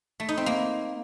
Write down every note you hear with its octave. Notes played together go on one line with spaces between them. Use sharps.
A3
D#4
C4
A#3